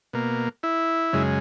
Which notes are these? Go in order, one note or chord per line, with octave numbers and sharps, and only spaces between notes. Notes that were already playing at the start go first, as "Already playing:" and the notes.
B2 A#3
E4
F#2 C#3 G#3